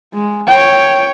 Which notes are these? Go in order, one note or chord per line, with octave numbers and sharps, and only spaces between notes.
G#3
C#5 G5